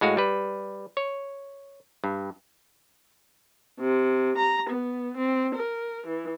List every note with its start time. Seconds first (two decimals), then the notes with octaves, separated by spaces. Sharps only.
0.01 A2 G#3 F#4 F5
0.17 G3 B4
0.97 C#5
2.04 G2
3.78 C3
4.37 A#5
4.69 B3
5.15 C4
5.54 A#4
6.06 E3